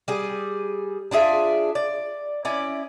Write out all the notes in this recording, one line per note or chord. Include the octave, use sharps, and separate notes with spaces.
G3 G#4
D4 F4 G#4 E5
D5
C#4 E4 D5 D#5